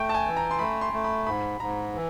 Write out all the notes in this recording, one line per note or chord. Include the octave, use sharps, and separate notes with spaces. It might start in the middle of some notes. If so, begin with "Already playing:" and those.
Already playing: A3 G5
A5
G#5
E3
A#5
C6
A3 B5
C6
A3
B5
G#2 B5
G#2 A#5
E3